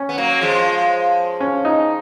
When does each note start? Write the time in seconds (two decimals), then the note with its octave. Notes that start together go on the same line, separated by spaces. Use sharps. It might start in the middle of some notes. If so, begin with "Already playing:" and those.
Already playing: C#4
0.09 B3
0.18 F#3 A#3
0.41 F3 G#3
1.40 C#4
1.65 D#4